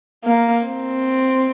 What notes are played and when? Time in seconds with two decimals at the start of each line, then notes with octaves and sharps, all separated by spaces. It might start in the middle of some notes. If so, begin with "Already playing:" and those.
0.24 A#3
0.65 C4